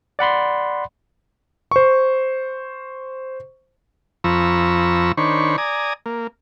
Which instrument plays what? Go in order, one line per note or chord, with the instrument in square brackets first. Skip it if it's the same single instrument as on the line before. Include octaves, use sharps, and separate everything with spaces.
[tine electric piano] D5 F#5 B5 C6
[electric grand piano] C5 C#6
[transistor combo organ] F2 F3 A#5 B5 C#6 E6
D#3 D4 C5 C#5 B5 C#6
D5 G#5 A#5 D#6
A#3